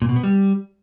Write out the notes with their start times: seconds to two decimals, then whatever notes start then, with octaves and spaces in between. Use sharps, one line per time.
0.02 A#2
0.09 B2
0.16 B3
0.23 G3